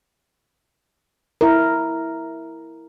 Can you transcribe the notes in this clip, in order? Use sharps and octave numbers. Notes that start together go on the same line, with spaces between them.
E4 A#4